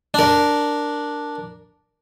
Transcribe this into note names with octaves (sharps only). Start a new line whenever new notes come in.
D4 A#4